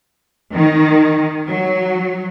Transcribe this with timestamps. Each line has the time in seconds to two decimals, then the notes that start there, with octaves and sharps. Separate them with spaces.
0.54 D#3
1.48 F#3